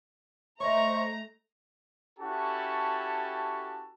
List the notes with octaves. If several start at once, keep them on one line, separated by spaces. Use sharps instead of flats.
A3 C5 C#5 D#5 E5 A#5 C6 C#6
C#4 E4 F#4 G4 A4 A5